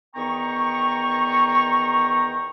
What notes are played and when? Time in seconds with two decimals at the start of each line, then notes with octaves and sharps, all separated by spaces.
0.15 E2 D#3 B3 G5 A#5 C#6